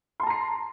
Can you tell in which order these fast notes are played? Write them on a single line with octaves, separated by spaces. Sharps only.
C6 A5 A#5 C7